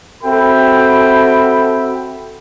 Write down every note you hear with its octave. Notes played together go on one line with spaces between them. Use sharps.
C4 F#4 A4 E5 G5 B5